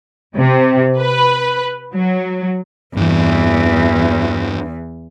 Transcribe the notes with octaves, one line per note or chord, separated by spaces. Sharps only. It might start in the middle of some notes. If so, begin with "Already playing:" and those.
C3
B4
F#3
E2 G2 E3